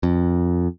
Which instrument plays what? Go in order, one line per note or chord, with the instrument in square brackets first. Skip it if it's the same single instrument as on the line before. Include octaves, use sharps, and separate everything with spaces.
[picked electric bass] F2